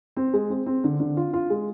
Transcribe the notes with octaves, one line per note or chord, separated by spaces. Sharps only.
C4
G#3
C4
C4
D3
D3
F4
F4
G#3